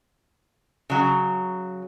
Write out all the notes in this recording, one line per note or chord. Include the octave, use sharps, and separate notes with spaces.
C#3 F#3